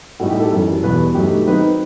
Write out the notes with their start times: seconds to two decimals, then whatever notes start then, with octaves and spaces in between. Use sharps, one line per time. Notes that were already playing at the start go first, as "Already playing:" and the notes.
0.20 A2 G3 D#4 F#4
0.30 G4
0.40 A4
0.51 F#2 E3 G3
0.83 E2 B2 G3 B4
1.14 G2 F#3 A3 D#4 G4
1.47 D#3 F#3 C4 D#4 B4